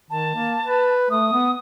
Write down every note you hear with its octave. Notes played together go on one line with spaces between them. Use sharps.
D#3 A5
A#3
B4
A3 D#6
B3